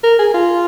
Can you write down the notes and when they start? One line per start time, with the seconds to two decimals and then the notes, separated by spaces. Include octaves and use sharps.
0.04 A#4
0.19 G#4
0.34 F4